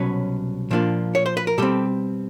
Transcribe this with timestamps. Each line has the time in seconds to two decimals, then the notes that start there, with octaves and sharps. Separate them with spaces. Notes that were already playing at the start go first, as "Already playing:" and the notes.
Already playing: C2 B2 F#3 C#4 B4 C#5
0.70 A#2 F3 A#3 D4 F4
1.15 C#5
1.26 C5
1.37 B4
1.47 A#4
1.58 B2 G3 C4 G4 A4